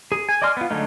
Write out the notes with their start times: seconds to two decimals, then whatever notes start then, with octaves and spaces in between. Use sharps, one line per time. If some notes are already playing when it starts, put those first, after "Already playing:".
0.12 G#4
0.29 G#5
0.42 D5 D#5 G#5 C6 F6
0.57 B3 F4
0.70 D3 F#3 G#3 A3 D#4